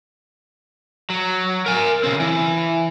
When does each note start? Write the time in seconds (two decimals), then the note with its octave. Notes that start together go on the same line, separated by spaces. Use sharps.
1.10 F#3
1.66 A#4 G#5
2.04 C#3 C4
2.20 E3